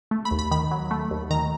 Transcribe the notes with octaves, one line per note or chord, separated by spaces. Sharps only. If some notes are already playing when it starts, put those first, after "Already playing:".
A3
B5
D#2
B5
D#3 B5
F#3
A3
D#2
D#3 A#5